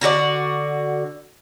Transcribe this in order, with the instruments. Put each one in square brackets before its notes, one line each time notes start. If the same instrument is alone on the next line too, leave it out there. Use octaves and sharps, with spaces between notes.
[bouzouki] D3 F#4 A4 D5